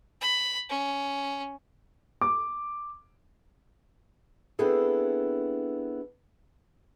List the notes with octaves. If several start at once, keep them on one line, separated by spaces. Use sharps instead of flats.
B5
C#4
D6
B3 C4 D4 E4 G#4 A4